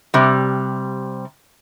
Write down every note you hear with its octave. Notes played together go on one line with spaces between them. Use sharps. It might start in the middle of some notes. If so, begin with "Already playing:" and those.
C3 G3